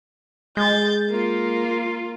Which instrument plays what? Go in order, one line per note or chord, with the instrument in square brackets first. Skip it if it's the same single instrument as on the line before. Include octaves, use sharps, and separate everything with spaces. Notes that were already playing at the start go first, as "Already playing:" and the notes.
[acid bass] G#3 [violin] G6 A6
[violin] A#3 F4